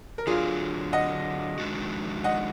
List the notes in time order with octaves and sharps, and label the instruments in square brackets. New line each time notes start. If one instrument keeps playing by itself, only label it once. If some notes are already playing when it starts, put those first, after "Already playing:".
[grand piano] A#4
[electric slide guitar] D3 F#3 D4 [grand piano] F4 G#4
[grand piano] D#5 F#5
[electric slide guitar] F2 D#3 G#3 D4 F#4
[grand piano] D#5 F#5